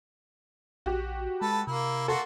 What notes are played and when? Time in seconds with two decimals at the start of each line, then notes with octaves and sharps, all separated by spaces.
0.86 A#1 F#4 G4
1.41 G#3 A4 B4
1.67 C3 A#3 E4
2.08 A#3 F#4 A4 C6